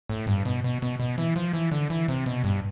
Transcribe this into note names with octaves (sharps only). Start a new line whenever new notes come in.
A2
G2
B2
B2
B2
B2
E3
F3
E3
D3
E3
C3
B2
G2